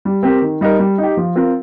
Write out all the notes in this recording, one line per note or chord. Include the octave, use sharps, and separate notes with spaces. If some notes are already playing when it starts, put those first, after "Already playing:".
G3
C4 G4 A#4
D#3
G3 D#4 A#4
G3
D#4 G4
F3
C4 F4 A#4